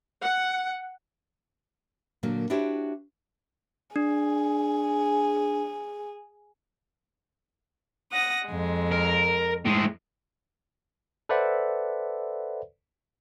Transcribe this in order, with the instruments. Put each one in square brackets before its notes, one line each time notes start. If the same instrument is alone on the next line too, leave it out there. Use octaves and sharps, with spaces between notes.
[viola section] F#5
[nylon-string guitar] A#2 D3 F#3 A#3
D4 E4 F#4 G4 C5 C#5
[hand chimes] D4 [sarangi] G#4
[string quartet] F#5 D#6 A#6
F2 G#3
[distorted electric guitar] A#4
A2 G#3
[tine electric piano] A4 B4 C5 D5 E5 F#5